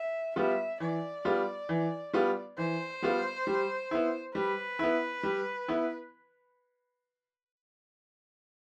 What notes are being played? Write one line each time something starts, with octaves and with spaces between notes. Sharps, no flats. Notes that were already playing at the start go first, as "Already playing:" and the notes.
Already playing: E5
G3 B3 F4 E5
E3 D5
G3 B3 F4
E3
G3 B3 F4
E3 C5
G3 B3 F4
G3
B3 E4
G3 B4
B3 E4
G3
B3 E4